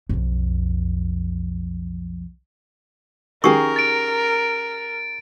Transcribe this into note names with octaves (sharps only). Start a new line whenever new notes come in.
B1 F2
D#3 C#4 G4 G#4 A#4 C#6
A6 D7